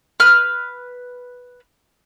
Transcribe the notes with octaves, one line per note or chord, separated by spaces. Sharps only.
B4 F6